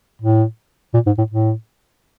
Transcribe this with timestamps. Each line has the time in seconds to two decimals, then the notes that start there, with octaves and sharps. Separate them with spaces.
0.22 A2
0.94 A#2
1.07 G#2
1.19 A2
1.31 A2